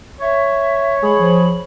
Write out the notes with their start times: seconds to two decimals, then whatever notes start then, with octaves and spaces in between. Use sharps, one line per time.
0.21 C#5 E5
1.03 G#3 G#4 B5
1.18 F3